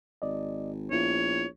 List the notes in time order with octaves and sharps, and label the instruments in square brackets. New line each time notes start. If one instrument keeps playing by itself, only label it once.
[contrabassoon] G#1 [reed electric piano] D5 D#5
[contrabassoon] A#1 [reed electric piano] B3 E4 F4 [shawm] C#5